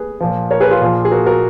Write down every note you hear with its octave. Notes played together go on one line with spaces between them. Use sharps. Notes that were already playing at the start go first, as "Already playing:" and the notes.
Already playing: G#4 B4
A#2 F3
A#4 C#5
G#4 B4
F4 G#4
A#2 F3
G#4
F#4 A#4
F#4 A#4